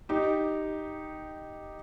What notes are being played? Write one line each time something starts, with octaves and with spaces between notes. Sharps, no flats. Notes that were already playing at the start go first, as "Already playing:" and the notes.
D#4 G4